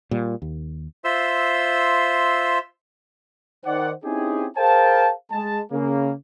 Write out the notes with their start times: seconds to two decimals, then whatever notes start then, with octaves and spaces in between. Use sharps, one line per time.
0.11 A#2 G3
0.42 D#2
1.04 F4 C5 E5 C6 E6
3.65 D#3 C5 D5 F#5
4.04 C4 C#4 D#4 E4 G4 G#4
4.57 G#4 A#4 C5 F5 G5 A5
5.32 G#3 A5
5.71 C#3 A#3